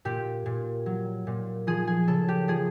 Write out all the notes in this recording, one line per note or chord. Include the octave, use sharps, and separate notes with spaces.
A#2 G4
A#2
F#3
A#2
F3 G#4
G#4
C#3 A4
G4
F3 G#4